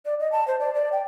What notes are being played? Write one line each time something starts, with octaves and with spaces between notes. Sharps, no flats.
D5
D#5
A5
C5
D5
D5
G5